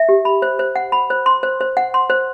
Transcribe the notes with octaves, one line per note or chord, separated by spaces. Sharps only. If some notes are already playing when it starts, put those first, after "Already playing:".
Already playing: E5
G4
B5
C5
C5
F#5
B5
C5
C6
C5
C5
F#5
C6
C5